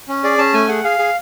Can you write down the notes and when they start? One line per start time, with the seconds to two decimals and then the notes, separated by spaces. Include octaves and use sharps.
0.08 C#4
0.24 G#4 D5
0.38 C#4 A5
0.54 A3 G#5
0.68 G#4 F#5
0.84 G#4 F5
0.99 G#4